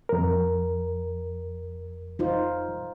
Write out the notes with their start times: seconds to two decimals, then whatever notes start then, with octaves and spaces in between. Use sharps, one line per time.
0.09 F2 A#4
2.19 D#4 F4 C5